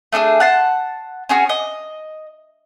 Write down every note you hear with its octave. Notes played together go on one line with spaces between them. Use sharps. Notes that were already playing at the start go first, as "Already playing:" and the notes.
A3 D4 E4 G#4
F#5 A5 C6
C#4 F#4 G#4
D#5